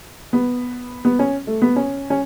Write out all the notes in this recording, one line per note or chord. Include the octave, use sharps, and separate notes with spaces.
B3
B3
C#4
A3
B3
C#4
C#4